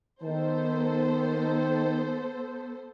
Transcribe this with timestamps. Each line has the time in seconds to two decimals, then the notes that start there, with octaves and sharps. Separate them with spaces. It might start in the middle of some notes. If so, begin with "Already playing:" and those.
0.23 D#3 B3 A4 C5